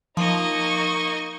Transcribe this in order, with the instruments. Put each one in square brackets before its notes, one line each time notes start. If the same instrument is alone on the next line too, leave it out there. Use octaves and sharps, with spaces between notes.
[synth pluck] F3 [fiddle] A#3 D#5 [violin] D#4 C#6